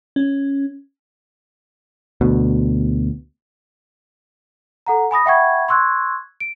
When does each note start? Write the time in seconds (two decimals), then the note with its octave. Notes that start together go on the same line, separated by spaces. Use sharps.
0.16 C#4
2.21 D2 B2
4.86 A4 F#5 A#5
5.11 G#5 B5 D#6 A#6
5.26 E5 F#5 G5 B5 C#6 G#6
5.68 C6 C#6 E6 F#6 G#6
6.40 D7